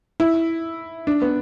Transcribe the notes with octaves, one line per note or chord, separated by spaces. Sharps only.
E4
D4
B3